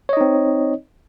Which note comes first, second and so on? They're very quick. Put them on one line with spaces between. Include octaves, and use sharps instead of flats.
C#5 D#5 D#4 C4